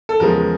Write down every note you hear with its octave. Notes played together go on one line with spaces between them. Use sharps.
A4
E2 C#3 F3 G#3 A#4